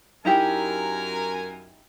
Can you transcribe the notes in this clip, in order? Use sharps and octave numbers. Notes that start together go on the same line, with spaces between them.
F#2 D#4 E4 G4 A#4 G#5